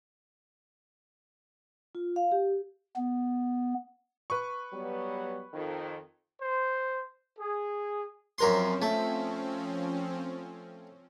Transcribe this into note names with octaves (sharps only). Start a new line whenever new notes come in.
F4
F5
G4
B3
B4 C#6
F#3 G3 B3
F2 D#3
C5
G#4
F#2 F3 C4 C#4 A#4 C6
A3